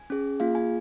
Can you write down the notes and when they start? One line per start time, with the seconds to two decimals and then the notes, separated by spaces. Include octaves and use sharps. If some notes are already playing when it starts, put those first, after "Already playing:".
Already playing: G#5
0.10 C#4 G#4
0.40 A#3 F4 G#4 F5
0.55 G#5